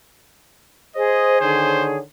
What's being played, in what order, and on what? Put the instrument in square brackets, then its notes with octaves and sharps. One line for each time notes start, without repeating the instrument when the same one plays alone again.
[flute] G#4 [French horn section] C5 [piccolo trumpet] D#5
[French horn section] D3 D#3 C#5 [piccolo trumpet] C5